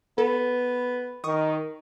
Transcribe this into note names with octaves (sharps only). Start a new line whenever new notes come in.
B3 A4
D#3 C#6 D#6